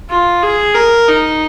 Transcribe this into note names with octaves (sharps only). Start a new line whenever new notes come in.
F4
G#4
A#4
D#4